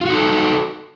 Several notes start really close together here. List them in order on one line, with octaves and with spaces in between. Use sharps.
F4 F#4 D#4 A4